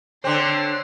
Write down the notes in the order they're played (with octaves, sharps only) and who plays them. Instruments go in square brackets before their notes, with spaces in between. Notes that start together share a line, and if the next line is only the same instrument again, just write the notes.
[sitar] D3 C4 [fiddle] C#5 C6